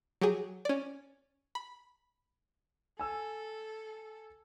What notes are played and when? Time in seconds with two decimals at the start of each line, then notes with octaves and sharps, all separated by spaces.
0.21 F#3 G4 G#4
0.65 C#4 D5
1.55 B5
2.99 A4 G#5 E6